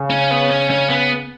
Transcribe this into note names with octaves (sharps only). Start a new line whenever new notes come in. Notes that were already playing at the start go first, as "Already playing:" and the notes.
Already playing: C#3
C#4
B3
C#4
C#4
B3